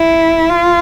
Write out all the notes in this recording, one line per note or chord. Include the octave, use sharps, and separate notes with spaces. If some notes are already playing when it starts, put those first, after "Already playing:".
Already playing: E4
F4